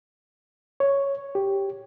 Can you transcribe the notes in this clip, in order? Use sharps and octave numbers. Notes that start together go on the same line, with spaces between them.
C#5
G4